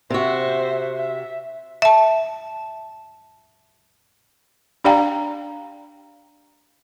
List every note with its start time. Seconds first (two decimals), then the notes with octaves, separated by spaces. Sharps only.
0.10 C3 F#4 C5 E5
0.96 E5
1.82 E5 A5
4.84 D4 G4 D5 F5 G5 A#5